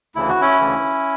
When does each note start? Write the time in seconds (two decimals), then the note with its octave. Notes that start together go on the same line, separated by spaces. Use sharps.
0.15 D2 C#3 E3 E4
0.29 F#4
0.41 C#4 E4
0.60 D2 C#3 E3